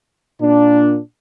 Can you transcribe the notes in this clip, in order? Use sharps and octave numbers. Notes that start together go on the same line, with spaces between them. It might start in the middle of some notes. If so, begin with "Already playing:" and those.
A#2 D4